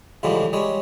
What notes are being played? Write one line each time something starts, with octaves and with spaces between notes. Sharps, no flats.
C#2 G#2 D3 E3 F3 G3
G3 G#3 C#5